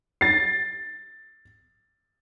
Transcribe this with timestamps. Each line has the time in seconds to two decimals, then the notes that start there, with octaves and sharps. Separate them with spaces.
0.21 A6 C7